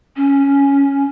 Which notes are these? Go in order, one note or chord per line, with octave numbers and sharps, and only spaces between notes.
C#4